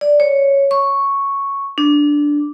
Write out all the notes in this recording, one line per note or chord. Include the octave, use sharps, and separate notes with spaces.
D5
C#5
C#6
D4